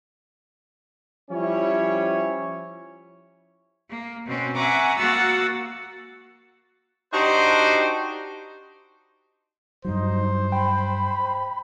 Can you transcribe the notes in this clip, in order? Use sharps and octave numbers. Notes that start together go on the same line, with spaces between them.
F3 G3 C#4 E4 C#5
A#3
B2 C4 C#4
E5 F#5 G#5 A#5 C#6 D6
A#3 F#4 F#5 E6 A6
D4 D#4 F#4 G4 C5
G2 F#3 D#4 C5
G5 B5